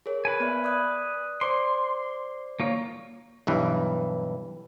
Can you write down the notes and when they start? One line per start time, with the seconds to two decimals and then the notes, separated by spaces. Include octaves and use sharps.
0.06 G#4 A#4 C#5
0.25 B4 G#5
0.40 B3 D5 E5
0.64 D5 D#6 F#6
1.41 C5 D5 C6 D6
2.60 A#3 F4 C#5
3.47 B1 G2 E3